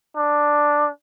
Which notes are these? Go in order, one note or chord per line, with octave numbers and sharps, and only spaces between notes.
D4